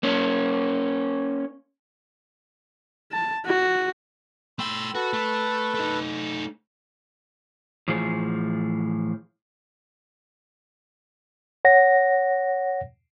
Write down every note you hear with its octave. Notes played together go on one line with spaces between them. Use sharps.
A#3 C#4
A5
F#4
A3 G5 B5 C6 E6
F#4 A4 B4
A3
A3 D#4
A2 E3 F3 F4 G#4
C#5 F#5 A#6